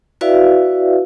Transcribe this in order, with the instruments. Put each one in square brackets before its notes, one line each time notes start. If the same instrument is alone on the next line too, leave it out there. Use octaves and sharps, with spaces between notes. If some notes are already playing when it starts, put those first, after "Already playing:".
[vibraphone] E4 F#4 B4 D5 E5 F5